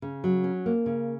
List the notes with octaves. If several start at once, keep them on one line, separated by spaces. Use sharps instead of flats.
C#3
F#3
C#4
A#3
C#3